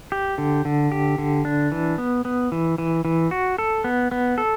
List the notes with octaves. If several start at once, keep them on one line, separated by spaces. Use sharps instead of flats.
G4
D3
D3
G4
D3
D4
E3
B3
B3
E3
E3
E3
F#4
A4
B3
B3
A4